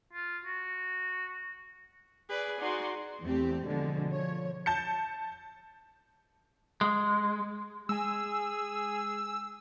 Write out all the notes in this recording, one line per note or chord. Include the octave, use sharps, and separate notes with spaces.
F4
F#4
G#4 B4 D5
D#4 F#4 D5 F#5 C6
E2 A3 C4 G4
B2 D3 F3 G#3
F3 C#5
A5 G6 C#7
G#3
G#3 G#4 G#5 E6